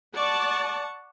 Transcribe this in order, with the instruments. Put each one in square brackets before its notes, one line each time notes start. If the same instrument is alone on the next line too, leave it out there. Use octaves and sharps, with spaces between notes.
[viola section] D5 A5 [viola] F#5 C#6